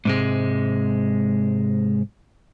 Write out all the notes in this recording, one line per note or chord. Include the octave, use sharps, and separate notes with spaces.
G#2 C3 G#3